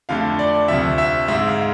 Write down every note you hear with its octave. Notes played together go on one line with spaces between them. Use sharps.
F2 D3 A3 F5
D5
D2 C3 F3 E5
E5
G#2 G#3 E5
F5